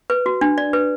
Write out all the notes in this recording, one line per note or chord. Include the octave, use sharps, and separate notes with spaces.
B4
F#4
D4
D5
B4